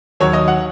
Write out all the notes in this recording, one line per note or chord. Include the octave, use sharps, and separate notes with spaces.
D#2 D#3 F#3 C#5
D#5
F#5